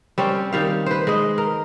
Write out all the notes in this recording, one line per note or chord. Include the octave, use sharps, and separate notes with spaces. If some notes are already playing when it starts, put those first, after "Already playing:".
G3 C4 C#4
D#3 G3 F5
B4 C5
G#3 D#5
A#4